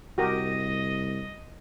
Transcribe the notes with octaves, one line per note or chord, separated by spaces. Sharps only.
C2 F#4 G4 A#4 D#5